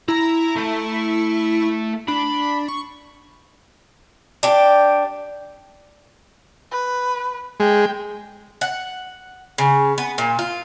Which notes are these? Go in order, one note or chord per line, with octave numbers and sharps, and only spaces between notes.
E4 A#5
A3
D4 B5
C#6
D4 G4
B4
G#3 G5
F#5
C#3
B3
A#2
F4